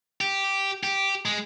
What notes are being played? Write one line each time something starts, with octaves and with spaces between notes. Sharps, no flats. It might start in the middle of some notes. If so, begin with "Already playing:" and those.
G4
G4
G#3